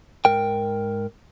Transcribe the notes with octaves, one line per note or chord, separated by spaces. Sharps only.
G#2 A#4 G5